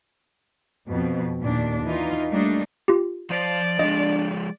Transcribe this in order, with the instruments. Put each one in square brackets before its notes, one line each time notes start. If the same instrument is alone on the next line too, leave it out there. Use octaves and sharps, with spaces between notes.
[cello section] F2 B2
D#2 A#2 D4
E3 D#4 F4
G3 A3 A#3 D4 D#4
[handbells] F4 G4
[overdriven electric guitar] F3 C5 [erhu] D5
[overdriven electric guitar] F3 G#3 [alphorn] D4 [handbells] D#5